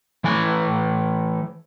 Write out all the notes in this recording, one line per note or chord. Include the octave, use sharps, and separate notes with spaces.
E3 A3 G#5